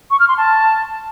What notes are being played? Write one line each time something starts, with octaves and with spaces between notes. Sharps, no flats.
C#6
F6
C6
A5